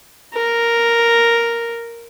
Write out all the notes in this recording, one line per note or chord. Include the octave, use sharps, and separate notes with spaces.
A#4